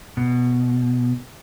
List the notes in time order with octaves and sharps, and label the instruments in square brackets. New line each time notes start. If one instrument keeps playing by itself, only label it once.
[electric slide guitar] B2